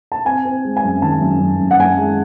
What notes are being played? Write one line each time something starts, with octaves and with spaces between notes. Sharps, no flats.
A5
C4 G#5
C4
G#3
G#5
F#2
D#3 A5
F#2
F#2
F#2
F#5
F#2 G#5
G#3